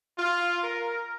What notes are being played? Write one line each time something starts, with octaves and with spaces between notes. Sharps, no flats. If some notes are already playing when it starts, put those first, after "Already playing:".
F4
A#4